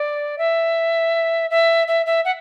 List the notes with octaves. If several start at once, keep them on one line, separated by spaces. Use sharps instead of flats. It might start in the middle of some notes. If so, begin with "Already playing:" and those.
Already playing: D5
E5
E5
E5
E5
F#5